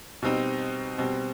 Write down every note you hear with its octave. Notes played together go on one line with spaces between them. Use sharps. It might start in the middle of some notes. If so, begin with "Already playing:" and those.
B2 G3 C4 D#4
B2 G3 C4